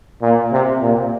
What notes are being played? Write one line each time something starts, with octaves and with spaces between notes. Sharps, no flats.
A#2
C3
A#2